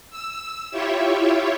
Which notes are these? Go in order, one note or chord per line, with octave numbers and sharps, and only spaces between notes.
E6
E4 F4 G4 C#5 E5